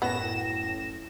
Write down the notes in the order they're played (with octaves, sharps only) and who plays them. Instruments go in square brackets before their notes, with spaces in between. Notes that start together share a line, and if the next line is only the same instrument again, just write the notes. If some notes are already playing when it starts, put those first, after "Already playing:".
[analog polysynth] F#2 A#6 E7 [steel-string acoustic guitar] A2 [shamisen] B3